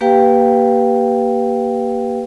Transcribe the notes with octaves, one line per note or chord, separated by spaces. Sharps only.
A#3 G4 B4 F5 G5